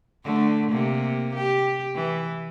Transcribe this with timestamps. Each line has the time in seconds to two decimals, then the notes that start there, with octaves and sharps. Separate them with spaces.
0.24 D3 A3
0.70 C3 A#3
1.35 G4
1.95 E3